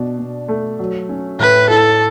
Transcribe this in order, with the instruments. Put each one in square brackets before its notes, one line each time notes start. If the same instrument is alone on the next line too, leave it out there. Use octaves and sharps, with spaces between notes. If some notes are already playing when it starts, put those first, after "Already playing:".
Already playing: [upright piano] B2 D4
B2
A3
F#3
C#4
[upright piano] A2 [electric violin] B4
[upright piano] E4 [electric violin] A4